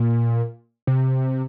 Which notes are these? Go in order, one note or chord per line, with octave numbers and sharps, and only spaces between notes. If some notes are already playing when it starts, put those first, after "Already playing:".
Already playing: A#2
C3